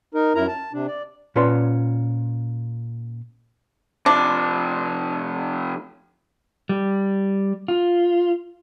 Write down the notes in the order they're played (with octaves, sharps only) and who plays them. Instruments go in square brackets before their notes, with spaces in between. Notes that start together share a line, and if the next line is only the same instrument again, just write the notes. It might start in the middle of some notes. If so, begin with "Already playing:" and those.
[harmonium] D#4 A#4
F#2 E4 A#4 A#5
A5
C3 D4
D5
[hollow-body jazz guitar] A#2 C#4 F4 B4 A5 C6
[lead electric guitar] C3 F3 [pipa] D4
[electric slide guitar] G3
F4